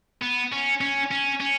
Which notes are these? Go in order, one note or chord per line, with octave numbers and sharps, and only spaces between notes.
B3
C#4
C#4
C#4
C#4